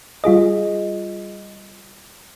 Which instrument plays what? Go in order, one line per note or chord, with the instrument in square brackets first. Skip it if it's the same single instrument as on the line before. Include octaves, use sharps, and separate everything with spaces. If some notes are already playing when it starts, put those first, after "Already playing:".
[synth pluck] G3 F4 G#4 D#5